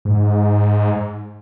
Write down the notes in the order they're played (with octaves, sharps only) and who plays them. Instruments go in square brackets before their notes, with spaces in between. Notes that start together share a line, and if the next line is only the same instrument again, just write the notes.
[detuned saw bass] G#2